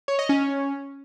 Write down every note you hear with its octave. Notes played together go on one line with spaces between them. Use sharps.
C#5
D#5
C#4